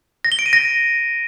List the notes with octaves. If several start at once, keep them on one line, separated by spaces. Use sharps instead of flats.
A#6
G7
D7
D#7
A#6